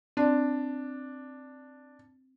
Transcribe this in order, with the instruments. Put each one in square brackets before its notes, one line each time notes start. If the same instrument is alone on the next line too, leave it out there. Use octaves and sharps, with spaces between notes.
[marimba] C4 D5 [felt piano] D4